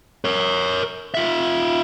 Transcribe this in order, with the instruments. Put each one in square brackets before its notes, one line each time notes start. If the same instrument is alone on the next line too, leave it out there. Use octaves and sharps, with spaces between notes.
[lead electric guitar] A#4 C#5
F4 E5